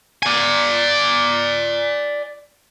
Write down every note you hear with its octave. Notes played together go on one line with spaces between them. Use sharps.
D5 G#5